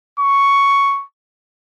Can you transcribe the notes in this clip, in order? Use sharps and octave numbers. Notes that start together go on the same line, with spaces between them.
C#6